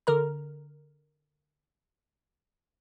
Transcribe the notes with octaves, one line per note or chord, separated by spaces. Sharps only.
D3 A#4 A#5